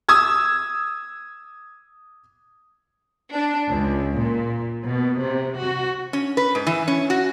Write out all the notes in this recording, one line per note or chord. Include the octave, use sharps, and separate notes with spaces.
D#6 E6 G#6
D4
C#2
A#2
B2
C3
F#4
C#4
B4
G#2
E3
C#4
F#4